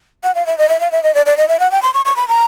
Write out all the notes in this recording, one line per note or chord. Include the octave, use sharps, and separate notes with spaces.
F#5
F5
E5
D#5
E5
F5
E5
D#5
D5
D5
D#5
E5
F#5
G5
C6
C#6
C#6
B5
A#5